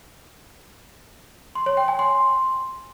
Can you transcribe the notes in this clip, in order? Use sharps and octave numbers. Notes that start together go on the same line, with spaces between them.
C6
C#5
G5
G#5
C6